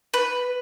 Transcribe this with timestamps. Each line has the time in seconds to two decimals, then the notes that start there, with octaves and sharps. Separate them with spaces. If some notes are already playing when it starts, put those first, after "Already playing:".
0.14 B4